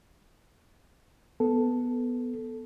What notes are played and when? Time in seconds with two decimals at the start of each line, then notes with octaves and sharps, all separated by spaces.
1.40 B3 A4